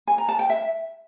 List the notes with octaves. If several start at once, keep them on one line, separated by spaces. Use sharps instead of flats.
G#5
A#5
A5
G5
E5